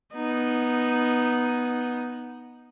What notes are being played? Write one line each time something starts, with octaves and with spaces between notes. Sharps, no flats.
B3 D#4